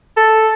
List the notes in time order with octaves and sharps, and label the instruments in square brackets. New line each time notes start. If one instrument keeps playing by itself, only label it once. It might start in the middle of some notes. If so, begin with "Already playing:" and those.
[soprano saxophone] A4